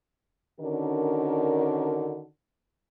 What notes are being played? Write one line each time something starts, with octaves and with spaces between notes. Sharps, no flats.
D3 D#3 C#4 D4 F#4 A#4